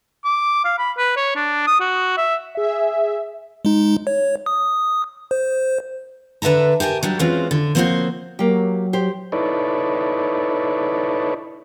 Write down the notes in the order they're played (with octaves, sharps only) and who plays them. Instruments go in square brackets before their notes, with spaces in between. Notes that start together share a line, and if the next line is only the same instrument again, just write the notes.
[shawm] D6
F5
B5
B4
C#5
D4
D#6
F#4
E5
[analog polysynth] G#4 E5
[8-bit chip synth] G#3 D#4
C#5
D#6
C5
[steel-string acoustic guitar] D3 B4 E5 A5 A#5
G4 A#4 G#5 A5
F#3 G3 D4
E3 G#3 C4 C#4 F4 F#4
D3
F3 A#3 C4 F#4 C5 C#5
[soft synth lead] F#3 [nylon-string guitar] A#3 G4
[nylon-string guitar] G4 C5
[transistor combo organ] D#4 E4 A4 B4 C#5 D5